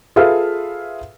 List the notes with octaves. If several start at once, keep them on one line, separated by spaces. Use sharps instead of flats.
F4 G#4 A4 B4 E5 F5